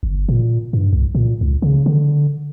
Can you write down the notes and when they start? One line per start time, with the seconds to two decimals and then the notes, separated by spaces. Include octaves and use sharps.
0.03 G1
0.29 A#2
0.73 G2
0.93 C2
1.15 A#2
1.41 C#2
1.62 C#3
1.86 D3